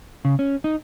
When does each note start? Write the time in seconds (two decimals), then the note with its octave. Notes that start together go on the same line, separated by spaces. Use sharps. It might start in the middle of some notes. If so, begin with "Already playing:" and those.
0.25 C#3
0.39 C#4
0.64 D#4